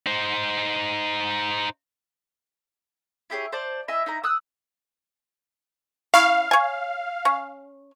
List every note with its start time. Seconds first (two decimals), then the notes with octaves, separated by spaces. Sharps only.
0.06 D#4 C5
3.30 E4 G4 G#4 C#5
3.52 C5 D5 A5
3.88 E4 D#5 E5 G#5
4.06 D#4 E4 A#5
4.24 D#6 E6 F#6
6.14 C#4 E4 F5 C#6
6.51 C#5 G#5
7.25 C#4